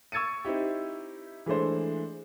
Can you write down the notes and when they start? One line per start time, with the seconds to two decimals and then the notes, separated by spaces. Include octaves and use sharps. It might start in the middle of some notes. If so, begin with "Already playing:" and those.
0.12 C#6 E6 G#6 A6 C#7 D#7
0.45 C4 D#4 E4 G4
1.46 E3 G#3 A3 D4 C5